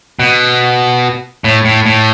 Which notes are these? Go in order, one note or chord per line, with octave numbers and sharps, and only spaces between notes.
B2
A2
A2
A2